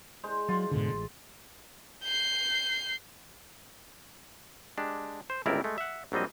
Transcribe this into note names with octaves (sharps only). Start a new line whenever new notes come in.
G#3 C5
F#3 F4
G#2 B2 D3
A1
G6 C7
G#3 D4 G4
C5
G1 C#2 C4 E4 A#4 D5
G#3 A3
E5 F#5
A#1 F#3 G3 C4 D#5